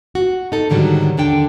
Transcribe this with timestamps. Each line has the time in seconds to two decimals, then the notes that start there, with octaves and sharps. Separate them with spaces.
0.15 F#4
0.52 D#4 A4
0.70 G#2 D3 D#3 F#3 G3
1.17 D#2 D3 D4 G5